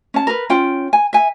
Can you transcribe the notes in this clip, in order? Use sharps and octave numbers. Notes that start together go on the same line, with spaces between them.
C#4 A5
A#4 B4
C#4 F4 G5
G#5
E5 G#5